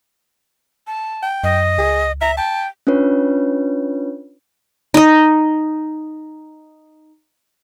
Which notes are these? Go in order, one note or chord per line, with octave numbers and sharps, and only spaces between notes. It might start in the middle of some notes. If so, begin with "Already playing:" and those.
A5
G5
F#2 D#5
C#2 G#4
E5 A#5
G5 A5
C#4 D4 F4 B4 C#5
D#4 D#5